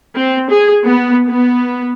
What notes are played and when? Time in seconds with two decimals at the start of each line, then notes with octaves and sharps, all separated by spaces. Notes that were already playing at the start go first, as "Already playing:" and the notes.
0.14 C4
0.47 G#4
0.85 B3
1.28 B3